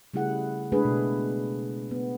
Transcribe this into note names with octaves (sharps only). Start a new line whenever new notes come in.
C#3 G3 A3 E4 G#4 F#5
G#3 A3 D4 G#4 B4
B2
B3